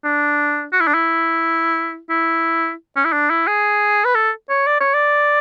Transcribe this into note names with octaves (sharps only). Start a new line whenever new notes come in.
D4
F#4
E4
D4
E4
E4
C#4
E4
D4
E4
G#4
B4
A4
C#5
D5
C#5
D5